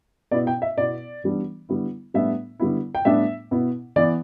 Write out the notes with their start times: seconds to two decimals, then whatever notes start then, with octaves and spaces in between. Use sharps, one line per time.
0.31 B2 B3 E4 D5
0.47 G5
0.62 E5
0.77 B2 B3 E4 D5
1.24 E3 G3 B3 D4
1.69 D3 G3 B3 E4
2.14 A2 G3 B3 D4 E5
2.60 D3 G3 B3 E4
2.95 G5
3.05 A2 G3 B3 D4 E5
3.51 B2 B3 E4
3.96 E3 B3 E4 D5